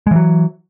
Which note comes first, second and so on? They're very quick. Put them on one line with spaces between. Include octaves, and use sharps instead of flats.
G#3 E3 F#3